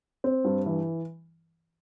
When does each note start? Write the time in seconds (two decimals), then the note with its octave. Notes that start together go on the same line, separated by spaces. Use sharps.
0.24 C4
0.44 G2
0.66 E3